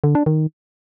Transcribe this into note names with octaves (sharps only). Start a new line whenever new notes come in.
D3
D4
D#3